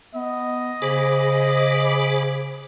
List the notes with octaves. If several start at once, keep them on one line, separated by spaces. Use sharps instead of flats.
B3 D#5
C#3 G#4 C5 B5 D6